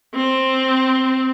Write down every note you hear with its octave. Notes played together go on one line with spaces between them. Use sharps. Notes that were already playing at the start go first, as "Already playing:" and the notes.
C4